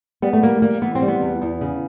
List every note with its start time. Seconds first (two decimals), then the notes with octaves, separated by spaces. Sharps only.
0.22 G3 B3
0.33 A3
0.43 G3 A#3
0.62 G3 A#3
0.82 E3 B3
0.95 C4
1.02 G3
1.08 B3
1.21 E2
1.42 E2
1.61 C#3